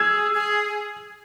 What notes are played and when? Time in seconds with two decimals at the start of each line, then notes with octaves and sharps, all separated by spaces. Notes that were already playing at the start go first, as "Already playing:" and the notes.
Already playing: G#4 E6 G#6
0.34 G#4